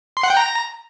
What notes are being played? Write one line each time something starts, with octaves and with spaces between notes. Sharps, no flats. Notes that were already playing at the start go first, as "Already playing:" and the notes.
C6
F#5
G5
A#5